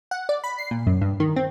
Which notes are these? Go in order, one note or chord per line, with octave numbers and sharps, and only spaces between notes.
F#5
D5
B5
C7
A#2
F#2
G2
D#3
C4